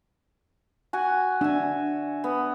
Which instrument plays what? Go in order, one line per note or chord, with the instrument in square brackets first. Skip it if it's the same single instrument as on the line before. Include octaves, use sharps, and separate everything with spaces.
[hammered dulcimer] F#4 G#5
[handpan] D4 [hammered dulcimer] E5 G#5
[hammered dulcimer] B3